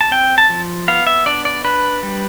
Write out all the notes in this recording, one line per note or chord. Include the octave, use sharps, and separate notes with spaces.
A5
C4 G5
A5
F3
B3 F5
E5
D4 D5
D5
D4 B4
G3